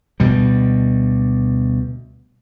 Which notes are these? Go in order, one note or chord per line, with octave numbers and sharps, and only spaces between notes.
D2 B2 G3